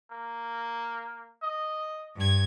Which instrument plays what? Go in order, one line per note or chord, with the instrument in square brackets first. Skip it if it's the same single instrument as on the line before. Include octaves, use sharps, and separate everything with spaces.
[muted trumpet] A#3
D#5
[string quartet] G2 G#6